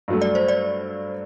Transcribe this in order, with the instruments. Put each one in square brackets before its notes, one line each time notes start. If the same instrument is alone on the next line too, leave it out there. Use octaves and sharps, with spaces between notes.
[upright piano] G2 F#3 A3
[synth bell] D5
C5
D5